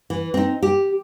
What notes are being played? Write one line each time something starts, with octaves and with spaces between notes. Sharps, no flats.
E3
C4 D#4
G4